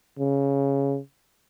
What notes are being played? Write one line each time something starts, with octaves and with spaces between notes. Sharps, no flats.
C#3